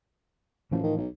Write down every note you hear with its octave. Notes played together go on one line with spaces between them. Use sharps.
F#1 A2 E3 F3
D#3
B1